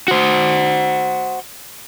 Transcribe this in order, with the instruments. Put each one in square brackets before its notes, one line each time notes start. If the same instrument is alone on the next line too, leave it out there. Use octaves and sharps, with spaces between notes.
[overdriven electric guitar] F#4 C5